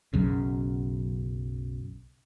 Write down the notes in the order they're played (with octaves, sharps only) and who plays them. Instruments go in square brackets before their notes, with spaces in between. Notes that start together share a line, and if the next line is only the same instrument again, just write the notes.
[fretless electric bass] B1 F#2 C#3